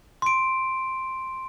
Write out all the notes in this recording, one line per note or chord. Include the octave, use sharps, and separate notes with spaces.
C6 D7